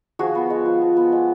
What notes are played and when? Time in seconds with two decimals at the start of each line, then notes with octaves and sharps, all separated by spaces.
0.19 F3 F#4 G#4
0.35 B3
0.50 G#3
0.66 F3
0.81 F3
0.97 B3
1.12 G#3